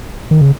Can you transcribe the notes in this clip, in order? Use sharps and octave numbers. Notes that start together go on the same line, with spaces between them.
D#3
C#3